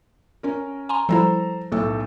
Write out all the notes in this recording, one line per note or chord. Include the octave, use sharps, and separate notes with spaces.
C#4 A#4
G#5 A#5 C6
F3 G3 E4 A4 C5 A#5
B1 A2 A4